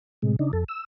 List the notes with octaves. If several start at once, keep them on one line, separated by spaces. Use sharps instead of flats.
A2 C3 G#3
C#3 D4 D#4
F2 A4
E6